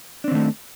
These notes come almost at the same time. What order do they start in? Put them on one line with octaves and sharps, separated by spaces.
D4 C4 D#3 A3